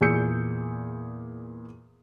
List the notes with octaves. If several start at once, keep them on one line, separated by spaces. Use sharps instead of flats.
E2 A#2 G#4 E6 G6 C#7